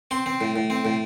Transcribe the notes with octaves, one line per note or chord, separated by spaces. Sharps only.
C4 C6
C4
A2
A2
C4
A2